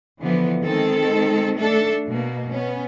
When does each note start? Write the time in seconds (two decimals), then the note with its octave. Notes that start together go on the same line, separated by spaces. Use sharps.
0.20 D3 E3 F3 B3
0.62 D#3 G#3 C4 A4
1.55 A3 D4 A4
2.09 B2 A#3
2.50 B3 C#4